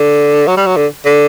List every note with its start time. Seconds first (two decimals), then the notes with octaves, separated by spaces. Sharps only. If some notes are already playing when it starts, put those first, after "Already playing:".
Already playing: D3
0.47 F#3
0.57 G3
0.66 F#3
0.77 D3
1.05 D3